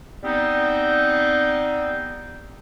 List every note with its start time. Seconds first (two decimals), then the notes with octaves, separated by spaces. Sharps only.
0.23 G3 B3 C4 D#4